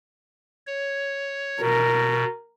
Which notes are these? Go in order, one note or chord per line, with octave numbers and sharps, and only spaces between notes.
C#5
B2 A#4